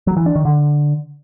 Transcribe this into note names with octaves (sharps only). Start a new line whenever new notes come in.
F#3
E3
D4
D#3
D3